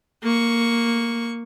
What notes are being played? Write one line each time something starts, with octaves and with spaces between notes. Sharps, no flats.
A#3 C#6